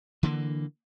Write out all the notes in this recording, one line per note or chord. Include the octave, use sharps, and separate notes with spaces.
D3 E3 A#3